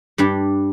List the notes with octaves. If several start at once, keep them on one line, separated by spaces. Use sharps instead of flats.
G2 G3 D4 G4